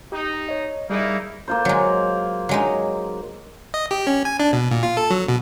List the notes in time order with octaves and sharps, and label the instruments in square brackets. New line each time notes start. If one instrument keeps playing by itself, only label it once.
[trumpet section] D#4 [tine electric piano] G4
[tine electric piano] C#5 D#5
[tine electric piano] G3 G#4 [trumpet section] A#3 D#4 E4
[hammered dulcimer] A#3 F4 C5
[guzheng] F#3 G#3
F#3 G#3 D#4
[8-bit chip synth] D#5
G4
C#4
G#5
D4
B2
A#2
F4
A4
F#3
B2